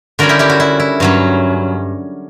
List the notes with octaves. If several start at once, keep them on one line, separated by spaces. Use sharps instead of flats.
D3 G3 C#4 F#4 A#4
E4 G4
E4 G4
F#4
E4
E4
G2 F#3 C#4